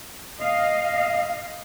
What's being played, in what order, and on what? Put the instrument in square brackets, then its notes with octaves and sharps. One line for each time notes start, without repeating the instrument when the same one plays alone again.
[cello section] D#5 F5